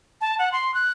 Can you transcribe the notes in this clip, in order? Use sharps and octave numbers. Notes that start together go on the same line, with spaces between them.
A5
F#5
C6
F#6